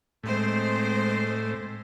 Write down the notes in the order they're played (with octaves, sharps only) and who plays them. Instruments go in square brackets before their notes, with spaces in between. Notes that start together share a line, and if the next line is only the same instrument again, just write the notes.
[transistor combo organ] A2 [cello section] G#3 C4 C5